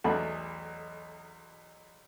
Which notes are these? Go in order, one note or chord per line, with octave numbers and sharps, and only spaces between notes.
B1 E2 A3 B5